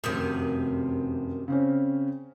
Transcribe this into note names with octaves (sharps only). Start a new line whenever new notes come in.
F1 F#2 C3 D#3 D#6
C#3 C4 C#4